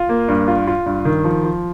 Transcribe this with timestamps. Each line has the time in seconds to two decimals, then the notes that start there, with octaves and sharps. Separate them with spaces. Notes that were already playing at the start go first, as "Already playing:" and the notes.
Already playing: F4
0.09 A#3
0.28 G2
0.48 F4
0.67 F4
0.86 G2
1.05 D#3
1.24 F3
1.44 F3